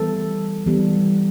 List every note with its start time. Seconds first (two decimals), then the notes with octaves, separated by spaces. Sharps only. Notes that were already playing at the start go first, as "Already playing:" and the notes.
Already playing: E3 G3 B3 A4
0.66 E3 G3 B3